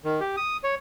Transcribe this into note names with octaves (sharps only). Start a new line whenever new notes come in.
D#3
G4
D#6
C#5